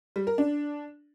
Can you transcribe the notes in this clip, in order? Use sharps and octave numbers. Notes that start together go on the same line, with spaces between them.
G3
A#4
D4